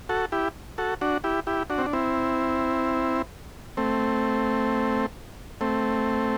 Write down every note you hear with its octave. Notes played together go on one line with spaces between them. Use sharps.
F#4 A4
E4 G4
F#4 A4
D4 F#4
E4 G4
E4 G4
D4 F#4
C4
D4
C4 E4
A3 C4
A3 C4